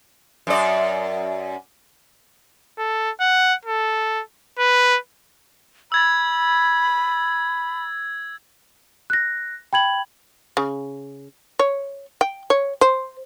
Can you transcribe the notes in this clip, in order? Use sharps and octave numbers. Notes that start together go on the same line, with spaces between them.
F#2 D5
A4
F#5
A4
B4
B5 E6 G#6 A6
F#6 A#6
G5 B5 G#6 F#7
C#3
C#5
G5
C#5
C5